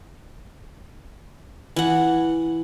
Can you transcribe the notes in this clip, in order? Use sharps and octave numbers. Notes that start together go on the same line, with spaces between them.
E3 F#5